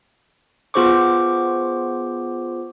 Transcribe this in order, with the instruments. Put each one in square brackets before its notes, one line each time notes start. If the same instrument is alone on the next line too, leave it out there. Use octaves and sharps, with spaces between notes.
[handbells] B3 F4 G#4 C5 C#6 D6